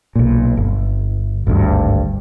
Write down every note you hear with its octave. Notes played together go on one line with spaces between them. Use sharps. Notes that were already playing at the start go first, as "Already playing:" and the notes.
B1 A#2
G1
G#1 D2 G2